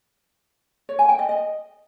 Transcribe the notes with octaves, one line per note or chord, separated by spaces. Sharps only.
C#5
G#5
G5
D#5
D#5